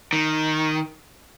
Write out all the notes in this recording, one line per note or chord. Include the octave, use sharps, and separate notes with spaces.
D#3